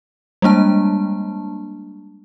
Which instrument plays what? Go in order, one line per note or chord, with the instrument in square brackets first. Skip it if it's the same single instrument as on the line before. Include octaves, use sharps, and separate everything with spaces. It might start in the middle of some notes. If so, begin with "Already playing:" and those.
[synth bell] G3 G#3 A#3 D4 A5